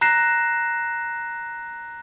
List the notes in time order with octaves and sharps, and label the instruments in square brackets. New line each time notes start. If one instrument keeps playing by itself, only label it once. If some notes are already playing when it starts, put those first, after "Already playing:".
[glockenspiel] A#5 F#6 A#6 C7 E7